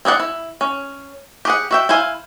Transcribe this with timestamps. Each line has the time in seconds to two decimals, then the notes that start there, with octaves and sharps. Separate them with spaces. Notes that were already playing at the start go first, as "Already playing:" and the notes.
0.05 C4 G#4 D5 F#5
0.20 E4
0.61 C#4
1.45 G4 G#4 F#5
1.71 F#4 E5 G5
1.89 E4 C5 F5 G#5